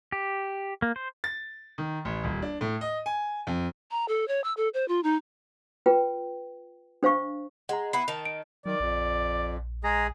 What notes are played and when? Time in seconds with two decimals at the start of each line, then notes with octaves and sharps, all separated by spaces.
0.12 G4
0.82 A#3
0.96 C5
1.24 A6
1.78 D#3
2.05 A1
2.24 D#1
2.42 D4
2.61 A2
2.81 D#5
3.06 G#5
3.47 F2
3.91 A#5
4.08 A4
4.28 C#5
4.44 E6
4.57 A4
4.74 C5
4.88 F4
5.03 D#4
5.86 F4 B4 G5
7.03 D4 C5 F5 C#6
7.69 G#3 F#5 A#5
7.93 B3 E4 B5 C7
8.08 D#3 A5 F7
8.25 D7
8.66 D#3 F#3 D5
8.80 A#1 F2
9.84 G#3 G#4 A#5